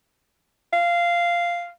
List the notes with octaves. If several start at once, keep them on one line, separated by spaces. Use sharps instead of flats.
F5